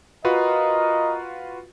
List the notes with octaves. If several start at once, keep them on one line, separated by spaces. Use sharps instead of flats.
F4 F#4 A#4 B4 D#5